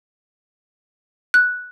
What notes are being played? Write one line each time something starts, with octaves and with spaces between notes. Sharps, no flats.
F#6